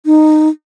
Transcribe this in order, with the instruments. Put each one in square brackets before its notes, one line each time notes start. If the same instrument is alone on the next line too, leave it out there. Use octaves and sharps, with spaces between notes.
[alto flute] D#4